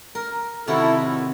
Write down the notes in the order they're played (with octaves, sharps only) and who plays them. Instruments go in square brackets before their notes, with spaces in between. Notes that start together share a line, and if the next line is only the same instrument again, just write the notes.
[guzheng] A#4
[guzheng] C3 D#3 F#4 [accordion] E4 A4
[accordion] A2